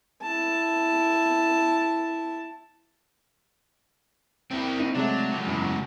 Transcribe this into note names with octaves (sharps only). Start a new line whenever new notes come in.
E4 A5
A#3 C4 E4 G5
D#4
C3 F#3 G#3 A3 D4
C#2 A2
F#2 B2 E3 F#3